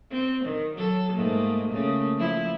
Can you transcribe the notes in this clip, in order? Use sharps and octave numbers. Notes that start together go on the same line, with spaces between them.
C4
D#3
F#3 A4
G#2 A3 A#3
C#3 A3 A#3
F3 E4